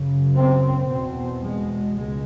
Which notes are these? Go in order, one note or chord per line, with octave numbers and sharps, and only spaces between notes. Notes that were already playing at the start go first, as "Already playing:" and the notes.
Already playing: F#2 C#3
C4
E2 B2 C4
G#3
C#2 G#3